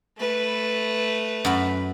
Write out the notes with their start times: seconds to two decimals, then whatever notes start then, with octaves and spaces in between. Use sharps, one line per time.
0.18 A3 B4
1.45 F#2 F#4 B5